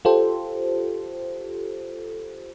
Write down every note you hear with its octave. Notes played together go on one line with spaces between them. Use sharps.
F4 G4 A4 C5